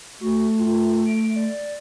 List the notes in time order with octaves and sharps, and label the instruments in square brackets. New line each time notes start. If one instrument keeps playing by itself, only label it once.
[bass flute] A3 [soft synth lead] F#4
[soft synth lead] F4
D7
D5